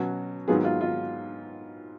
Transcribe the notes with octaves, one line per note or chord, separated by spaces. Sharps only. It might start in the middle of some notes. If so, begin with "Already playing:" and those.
Already playing: B2 F#3 C#4 F#4
G#2 D#3 F#3 B3 F4 G#4
F4
F4